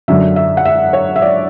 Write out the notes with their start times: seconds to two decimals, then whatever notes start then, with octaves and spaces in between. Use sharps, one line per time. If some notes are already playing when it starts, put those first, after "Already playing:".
0.08 F#2 D3 F#3 E5
0.36 E5
0.57 F#5
0.65 E5
0.93 C#5
1.16 E5
1.22 D5